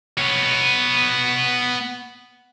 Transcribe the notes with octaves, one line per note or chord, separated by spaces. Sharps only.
B3 C#5